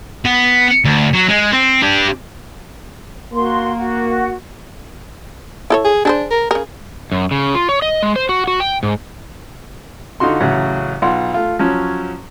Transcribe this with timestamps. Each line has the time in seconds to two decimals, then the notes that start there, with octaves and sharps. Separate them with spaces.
0.25 B3
0.85 D2
1.13 F#3
1.28 G#3
1.52 C4
1.83 D4 G4
3.33 A#3 F#4 C6
3.77 F#4
5.70 E4 A4 C#5
5.85 G#4
6.05 D4 G#4 A4 C5
6.31 A#4
6.51 C#3 G#4 A#4
7.12 F#2
7.31 C#3
7.55 F4
7.69 C#5
7.82 D#5
8.03 G#3
8.16 C5
8.29 F#4
8.48 F#4
8.60 G5
8.83 G#2
10.20 D3 D#4 F4 F#4 C6
10.40 A1 C#3 F#3 F#5
11.02 B1 F4 F#5 C6
11.34 A3 F4
11.59 F3 F#3 C#4